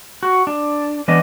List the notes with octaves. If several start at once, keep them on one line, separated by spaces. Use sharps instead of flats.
F#4
D4
E3 B3 D4 D#5